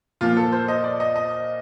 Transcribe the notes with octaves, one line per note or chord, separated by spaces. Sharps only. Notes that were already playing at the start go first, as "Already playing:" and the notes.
A#2 F3 F4
A4
C5
D#5
D5
D#5
D#5